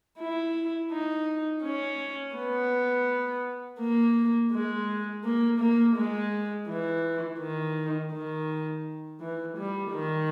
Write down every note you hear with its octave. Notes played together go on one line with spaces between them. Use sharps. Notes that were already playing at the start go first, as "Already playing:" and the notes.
E4
D#4
C#4
B3
A#3
G#3
A#3
A#3
G#3
E3
D#3
D#3
E3
G3
D#3